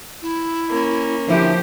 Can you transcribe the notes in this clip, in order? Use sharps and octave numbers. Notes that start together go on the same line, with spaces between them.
E4
A#3 C#4
D3 F3 E4 G4 B4 C5